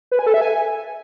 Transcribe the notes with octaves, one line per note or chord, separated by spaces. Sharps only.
B4
G#5
A4
E5
G#5